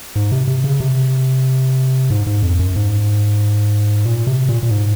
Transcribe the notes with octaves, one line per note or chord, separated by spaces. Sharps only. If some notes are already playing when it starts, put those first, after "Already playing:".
G#2
C3
C3
C#3
C3
G#2
G#2
F2
F#2
G#2
A#2
C3
A#2
A#2
G#2